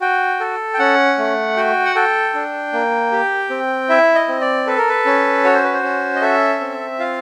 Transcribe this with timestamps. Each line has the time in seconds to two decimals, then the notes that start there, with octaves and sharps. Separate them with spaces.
0.01 F#4 G5
0.40 A4
0.74 G5
0.79 C#4 F#5
1.18 A3
1.56 F#4 G5
1.85 F#5
1.95 A4 G5
2.34 D4
2.73 A#3
3.12 G4
3.50 C4
3.89 E4 E5
4.15 D#5
4.28 C4
4.41 D5
4.67 A4 B4
4.78 A#4
4.88 B4
5.05 C#4
5.44 F#4 C#5
5.54 C5
5.64 B4
5.74 C5
5.83 C#4
6.16 D#5
6.22 A4 E5
6.61 C4
6.99 F4 F5